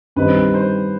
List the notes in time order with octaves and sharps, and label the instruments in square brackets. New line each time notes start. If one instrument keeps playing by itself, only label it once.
[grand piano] G2 D#3 G3 C4 D#4 [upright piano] B4
[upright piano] C5